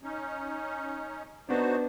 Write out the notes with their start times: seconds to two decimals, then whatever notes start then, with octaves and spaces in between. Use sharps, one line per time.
0.03 C#4 D#4
1.49 B3 D4 D#4 F#4 C5